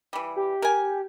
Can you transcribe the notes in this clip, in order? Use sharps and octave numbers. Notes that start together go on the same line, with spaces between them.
E3 G3
G4
A#4 G#5